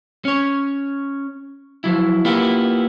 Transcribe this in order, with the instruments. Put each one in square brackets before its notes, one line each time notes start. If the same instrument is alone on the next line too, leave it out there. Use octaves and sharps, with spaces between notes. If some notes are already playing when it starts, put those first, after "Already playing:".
[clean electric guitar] C#4 C#5
F3 F#3 E4
A#3 B3 E4 F4 G4